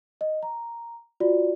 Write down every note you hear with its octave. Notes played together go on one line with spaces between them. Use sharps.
D#5
A#5
F4 F#4 D5